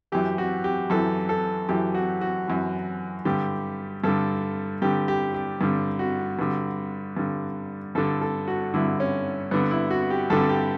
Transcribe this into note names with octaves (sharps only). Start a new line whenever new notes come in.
F#2 E3 G4
F#4
G4
F#2 E3 A4
A4
F#2 E3 G4
F#4
F#4
F#2 E3
G2 D3 G4
G2 D3 A4
G2 D3 G4
G4
G4
G2 D3
F#4
G2 D3
G2 D3
G2 D3 A4
A4
F#4
G2 D3 E4
C#4
G2 D3 B3
E4
F#4
G4
G2 D3 A4
G4